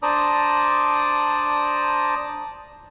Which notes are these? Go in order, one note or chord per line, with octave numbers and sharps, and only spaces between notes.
D4 C5 D5 A5 A#5 D#6